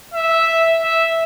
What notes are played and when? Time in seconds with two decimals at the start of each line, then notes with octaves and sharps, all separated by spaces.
0.14 E5
0.83 E5